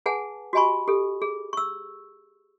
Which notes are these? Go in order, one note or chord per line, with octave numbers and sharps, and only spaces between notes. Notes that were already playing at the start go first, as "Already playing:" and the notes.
G#4 B4 F#5 G#5 A5
F#4 G4 D#5 G#5 B5 C#6
G4 A4
G#4
C#6 E6